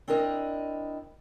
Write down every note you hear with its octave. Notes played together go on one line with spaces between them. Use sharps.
C4 D4 E4 A#4 D#5